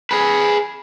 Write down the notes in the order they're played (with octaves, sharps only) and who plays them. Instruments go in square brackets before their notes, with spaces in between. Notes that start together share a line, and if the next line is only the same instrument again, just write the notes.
[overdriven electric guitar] G#4 B4